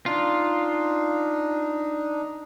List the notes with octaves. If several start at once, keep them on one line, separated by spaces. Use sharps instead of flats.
D4 D#4 F4